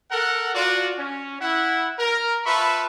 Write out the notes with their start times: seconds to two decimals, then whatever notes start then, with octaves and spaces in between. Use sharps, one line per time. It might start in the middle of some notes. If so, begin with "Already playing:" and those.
0.11 A4 A#4 F#5
0.54 F4 F#4 D5
0.99 C#4
1.40 E4 F#5
1.99 A#4
2.46 F4 B4 E5 A5 B5 C#6